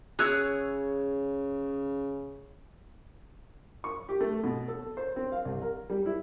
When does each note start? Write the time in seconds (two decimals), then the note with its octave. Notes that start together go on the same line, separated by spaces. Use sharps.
0.19 C#3 G#4 C#5 E6 F#6
3.84 C#6
4.09 G4
4.20 A3
4.44 B2
4.68 A4
4.97 C5
5.16 C4
5.32 F5
5.45 C2
5.62 A#4
5.89 G3
6.06 E4